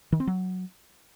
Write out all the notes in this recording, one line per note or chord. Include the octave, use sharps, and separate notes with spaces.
D#3
C4
F#3